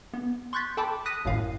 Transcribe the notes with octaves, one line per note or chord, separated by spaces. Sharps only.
B3
C6 C#6 F#6 G6 A6 B6
A4 G5 A5 B5 D6
D#6 F#6 A#6 B6 D#7
G#1 F#2 A2 F5